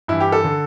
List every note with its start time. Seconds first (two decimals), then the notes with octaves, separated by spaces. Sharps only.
0.08 G2 E3 E4
0.20 G4
0.32 A4
0.44 D3